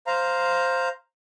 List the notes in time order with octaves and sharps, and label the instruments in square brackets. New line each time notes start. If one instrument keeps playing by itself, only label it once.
[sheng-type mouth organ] C5 F5 A#5